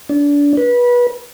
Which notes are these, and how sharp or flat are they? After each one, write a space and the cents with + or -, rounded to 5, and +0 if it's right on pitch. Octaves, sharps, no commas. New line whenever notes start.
D4 -30
B4 -25